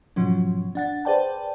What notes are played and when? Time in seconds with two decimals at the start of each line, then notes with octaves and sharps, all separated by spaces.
0.16 G#2 B2 F3 F#3 C#4
0.75 D4 F#5 A6
1.05 G#4 B4 C5 D5 G5 A5